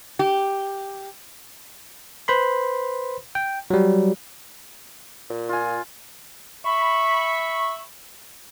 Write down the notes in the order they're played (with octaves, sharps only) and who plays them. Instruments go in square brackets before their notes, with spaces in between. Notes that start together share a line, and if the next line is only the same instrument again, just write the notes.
[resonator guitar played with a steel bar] G4
[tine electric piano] B4 C5 B5 C6
G5
F#3 G3
[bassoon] A#2
[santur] F4 G#5
[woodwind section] E5 B5 C#6